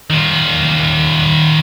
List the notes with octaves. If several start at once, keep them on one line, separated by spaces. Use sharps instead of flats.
D#3 F4